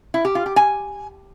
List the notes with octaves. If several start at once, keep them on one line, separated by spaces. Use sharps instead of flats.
E4
G4
F4
G4
G#5